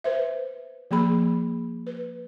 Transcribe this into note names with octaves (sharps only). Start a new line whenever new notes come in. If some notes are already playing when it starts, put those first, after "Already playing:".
B4 C5 E5
F3 A#3 G#4 B5
B4